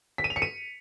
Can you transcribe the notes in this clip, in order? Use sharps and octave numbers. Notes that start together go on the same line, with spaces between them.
B6
D#7
F7
C#7
D#7